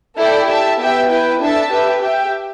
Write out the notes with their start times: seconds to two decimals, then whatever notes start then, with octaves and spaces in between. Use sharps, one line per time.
0.17 E4 A4 D5 G5
0.48 G4 E5 A5
0.79 B3 G4 E5 G5
1.10 E4 B4 G5
1.40 D4 A4 E5 A5
1.71 G4 B4 E5
2.02 G4 E5 G5